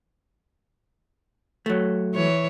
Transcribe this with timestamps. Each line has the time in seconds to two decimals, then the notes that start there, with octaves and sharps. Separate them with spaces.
1.66 F#3 A3
2.14 E3 C#5